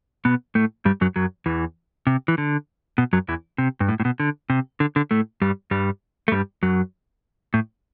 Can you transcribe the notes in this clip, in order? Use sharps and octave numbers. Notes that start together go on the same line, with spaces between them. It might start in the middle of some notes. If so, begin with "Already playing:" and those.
B2 B3
A2 A3
G2 G3
F#2 F#3
F#2 F#3
E2 E3
C3
E3
D3
B2
F#2 F#3
E2 E3
C3
G2
A2
A2
B2
D3
C3
D3
D3
A2 A3
G2 G3
G2 G3
A3
G2 G3
F#2 F#3
A2